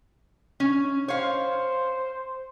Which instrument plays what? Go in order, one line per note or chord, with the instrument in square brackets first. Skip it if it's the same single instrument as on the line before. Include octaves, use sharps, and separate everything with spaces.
[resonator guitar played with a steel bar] C#4
[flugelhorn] C5 [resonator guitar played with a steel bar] C#5 F5